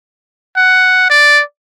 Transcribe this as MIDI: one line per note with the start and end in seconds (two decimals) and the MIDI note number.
0.57 1.07 78
1.10 1.42 74